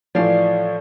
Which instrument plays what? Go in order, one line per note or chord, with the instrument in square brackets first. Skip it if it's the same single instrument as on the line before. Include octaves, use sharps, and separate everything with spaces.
[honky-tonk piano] A2 E3 F3 [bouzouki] D5 F5